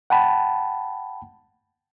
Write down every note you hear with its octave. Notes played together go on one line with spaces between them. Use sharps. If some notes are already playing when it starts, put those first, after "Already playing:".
F#5 G5 A5 B5